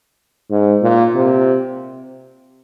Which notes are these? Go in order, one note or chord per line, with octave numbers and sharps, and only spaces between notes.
G#2
A#2
C3